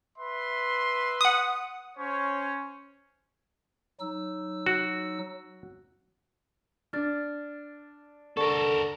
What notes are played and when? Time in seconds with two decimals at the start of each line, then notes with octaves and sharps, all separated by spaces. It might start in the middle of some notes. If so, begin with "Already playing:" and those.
0.18 B4 E5 C6
1.21 F#5 D#6
1.98 C#4 C5 C#5
4.00 F#3 D#4 E6
4.66 F#4
6.93 D4 F6 A6
8.37 D3 A4 A#4 C#6